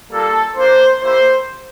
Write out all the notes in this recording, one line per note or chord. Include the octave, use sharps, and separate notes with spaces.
G3 A#3 F4 A4
A#3 D4 F4 C5
A#3 E4 G4 C5